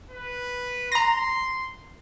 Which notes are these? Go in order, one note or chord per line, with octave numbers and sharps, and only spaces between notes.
B4
A#5 C6 A#6